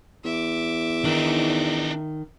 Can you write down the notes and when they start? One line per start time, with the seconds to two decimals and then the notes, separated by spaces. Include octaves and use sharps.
0.24 E2 E5 D6
1.05 D#3 D4 D#4